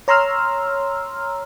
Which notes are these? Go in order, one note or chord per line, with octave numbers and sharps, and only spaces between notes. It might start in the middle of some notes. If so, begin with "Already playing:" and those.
C#5 A#5 C6 E6 F6